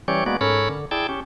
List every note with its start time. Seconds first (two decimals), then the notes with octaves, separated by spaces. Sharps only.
0.08 E3 G3 C#4 G4 C#5 D5
0.26 G#3 A#3 B3 F#4 D5
0.41 G#2 C#4 A4 A#4 C#5 B5
0.69 D3
0.91 E4 G#4 D5 G5 A5
1.09 C#4 G4